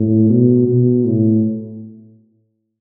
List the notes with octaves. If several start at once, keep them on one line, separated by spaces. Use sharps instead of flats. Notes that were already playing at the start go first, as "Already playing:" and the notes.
Already playing: A2
B2
B2
A2